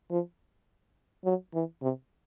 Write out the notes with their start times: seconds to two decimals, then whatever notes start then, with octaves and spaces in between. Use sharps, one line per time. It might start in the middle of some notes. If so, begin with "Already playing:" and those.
0.11 F3
1.25 F#3
1.54 E3
1.82 C3